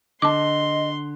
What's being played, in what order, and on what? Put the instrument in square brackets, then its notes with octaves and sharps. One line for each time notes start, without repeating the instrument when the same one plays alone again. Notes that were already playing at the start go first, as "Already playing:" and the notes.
[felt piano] D3 [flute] D#5 [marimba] A5 D6 [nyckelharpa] C6